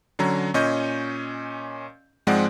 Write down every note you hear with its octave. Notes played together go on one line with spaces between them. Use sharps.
D3 F#3 C#4 A#5
A#2 C#4 D#5 C#6 G6
G#2 F3 G#3 C4 D5 F#5